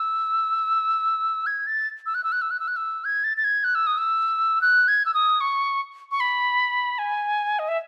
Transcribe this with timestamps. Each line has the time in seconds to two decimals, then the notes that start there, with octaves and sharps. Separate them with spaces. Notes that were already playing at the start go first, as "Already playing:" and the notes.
Already playing: E6
1.47 G#6
1.67 A6
2.06 E6
2.15 F#6
2.24 E6
2.32 F#6
2.42 E6
2.51 F#6
2.60 E6
2.68 F#6
2.77 E6
3.05 G#6
3.24 A6
3.37 A6
3.44 G#6
3.64 F#6
3.75 E6
3.87 D#6
3.98 E6
4.62 F#6
4.88 G#6
5.06 E6
5.14 D#6
5.41 C#6
6.11 C#6
6.20 B5
6.99 G#5
7.59 D#5
7.68 E5